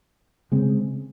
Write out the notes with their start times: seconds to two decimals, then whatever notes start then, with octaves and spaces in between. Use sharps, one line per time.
0.52 C#3 G#3 C4